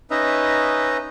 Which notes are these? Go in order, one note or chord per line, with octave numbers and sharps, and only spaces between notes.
C#4 D#4 B4 D#5 E5 A#5